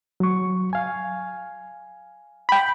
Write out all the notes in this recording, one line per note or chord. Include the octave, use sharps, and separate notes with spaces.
F#3 C#6
F5 G#5
G5 B5